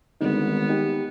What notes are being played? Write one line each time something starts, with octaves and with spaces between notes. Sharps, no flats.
G#1 D3 G3 B3 D#4
D#4 G4